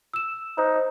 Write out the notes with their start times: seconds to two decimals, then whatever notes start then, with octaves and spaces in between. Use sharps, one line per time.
0.14 E6 E7
0.58 D#4 C5